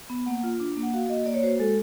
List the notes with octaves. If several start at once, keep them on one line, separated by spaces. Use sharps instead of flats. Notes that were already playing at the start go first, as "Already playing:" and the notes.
B3
A#3 F#5
F4
D4
A#3
F#5
F#4 F5
A#3 D#5
A#3 D5
C#5
F#4 C5
G#3 A4